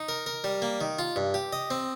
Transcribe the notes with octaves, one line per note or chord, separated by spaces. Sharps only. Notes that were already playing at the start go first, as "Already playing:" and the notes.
Already playing: D#4
A#4
A#4
G3
A#3
D#3
F4
G2
G4
D#5
C4